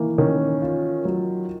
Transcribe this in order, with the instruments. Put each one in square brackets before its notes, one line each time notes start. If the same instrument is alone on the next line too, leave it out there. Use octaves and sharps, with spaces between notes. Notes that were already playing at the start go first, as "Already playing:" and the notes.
Already playing: [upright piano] D#3 E3 [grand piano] A#3
[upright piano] D#3 [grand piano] C#4
[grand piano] F4
F#3